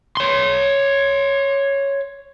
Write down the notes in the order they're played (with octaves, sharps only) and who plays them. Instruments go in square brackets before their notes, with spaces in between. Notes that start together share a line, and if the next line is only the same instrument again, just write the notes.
[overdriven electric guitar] C#5 C6